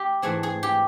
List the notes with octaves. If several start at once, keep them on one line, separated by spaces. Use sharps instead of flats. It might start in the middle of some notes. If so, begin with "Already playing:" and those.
Already playing: G4
G#2 E3 A3 C4 G#4
G#4
G4